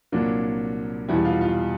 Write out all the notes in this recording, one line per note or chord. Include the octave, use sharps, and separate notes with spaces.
C2 A#2 F#3 A#3 D4
E2 B2 G3 E4
F4
F4